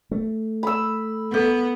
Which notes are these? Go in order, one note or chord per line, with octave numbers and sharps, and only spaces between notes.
A3
B5 E6
B3 A4